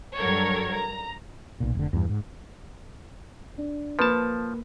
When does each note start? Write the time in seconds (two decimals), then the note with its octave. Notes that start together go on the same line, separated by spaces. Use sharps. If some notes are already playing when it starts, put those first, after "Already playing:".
0.18 G2 F#3 A4 A#4 C#5 G#6
0.74 A#5
1.60 B1 A#2
1.75 F1 D3
1.93 E2 G2
2.09 G#2
3.58 D4
3.99 F3 A#3 B4 A5